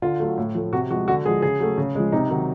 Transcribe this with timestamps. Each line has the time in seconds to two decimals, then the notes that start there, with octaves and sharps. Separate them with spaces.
0.02 D3 F4
0.20 F#3 A3
0.38 A2
0.55 F3 A3
0.72 C3 F#4
0.90 F3 G#3 F#4
1.08 D3 F#4
1.25 G#3 G#4
1.28 F3
1.42 C#3 G#4
1.60 F#3 A3
1.78 C#3
1.95 F3 G#3
2.12 C3 D#4
2.30 D#3 F#3